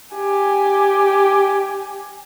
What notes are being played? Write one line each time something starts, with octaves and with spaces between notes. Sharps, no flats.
G4 G#5